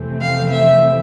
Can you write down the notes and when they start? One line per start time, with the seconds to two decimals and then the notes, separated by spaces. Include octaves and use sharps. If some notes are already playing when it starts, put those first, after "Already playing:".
Already playing: F2 C3 E3 A3 C4
0.21 F5
0.50 E5